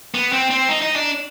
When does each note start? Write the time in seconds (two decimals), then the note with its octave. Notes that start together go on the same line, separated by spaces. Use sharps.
0.14 B3
0.33 C4
0.50 C4
0.68 D#4
0.82 D#4
0.96 D4